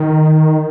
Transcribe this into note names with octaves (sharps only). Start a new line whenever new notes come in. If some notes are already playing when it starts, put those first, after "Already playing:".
Already playing: D#3